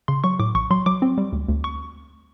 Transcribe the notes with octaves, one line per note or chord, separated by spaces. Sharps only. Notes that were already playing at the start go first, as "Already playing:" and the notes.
C#3 C6
F#3 C#6
A2 D6
A#1 C#6
F#3 C6
F#3 D6
C4
G3
D2
D2
C#6